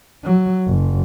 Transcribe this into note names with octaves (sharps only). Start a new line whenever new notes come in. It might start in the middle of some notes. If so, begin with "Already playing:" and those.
F#3
F#1